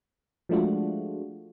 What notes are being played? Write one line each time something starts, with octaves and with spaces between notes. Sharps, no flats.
F3 G#3 A3 D4 F4 F#4